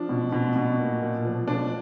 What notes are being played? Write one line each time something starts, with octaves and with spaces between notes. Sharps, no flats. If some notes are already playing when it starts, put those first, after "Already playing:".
Already playing: F3 D4
B2
B2
B2
A#2
A#2
F3
B2 D4 F4